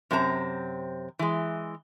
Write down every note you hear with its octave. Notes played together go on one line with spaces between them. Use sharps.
F#2 C3 C4 G4 A#5
E3 G#3